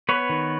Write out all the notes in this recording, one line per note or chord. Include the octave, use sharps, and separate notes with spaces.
B3 B4 C#5
D#3